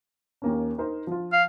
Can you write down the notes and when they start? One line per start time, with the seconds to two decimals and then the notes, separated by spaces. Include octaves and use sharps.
0.42 D#2 A#3 C#4
0.78 D#4 A#4 C5
1.07 F3 F4
1.33 F5